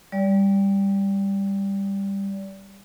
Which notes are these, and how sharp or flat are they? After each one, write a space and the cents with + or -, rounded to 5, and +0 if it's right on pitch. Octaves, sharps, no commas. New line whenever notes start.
G3 +15 D5 -30